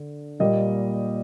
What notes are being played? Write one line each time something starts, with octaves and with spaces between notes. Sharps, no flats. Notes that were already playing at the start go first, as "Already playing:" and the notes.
Already playing: D3
A#2 G3 A#3 D#5